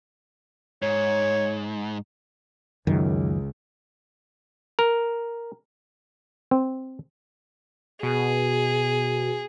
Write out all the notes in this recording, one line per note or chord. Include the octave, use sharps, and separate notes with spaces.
G#2 C#5
C#2 F#2 D#3
A#4
C4
B2 G#4